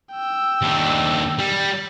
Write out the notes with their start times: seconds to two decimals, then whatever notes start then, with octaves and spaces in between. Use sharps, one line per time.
0.12 G5 E6
0.62 D#2 D4
1.39 G3